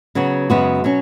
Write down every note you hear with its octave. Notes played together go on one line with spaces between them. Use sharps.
C#3 F#3 B3 F#4
F#2 C#3 G#3 B3 F#4
B2 F#3 C#4